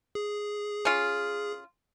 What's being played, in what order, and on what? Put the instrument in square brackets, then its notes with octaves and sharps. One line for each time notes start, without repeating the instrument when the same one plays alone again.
[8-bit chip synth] G#4
[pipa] C#4 F4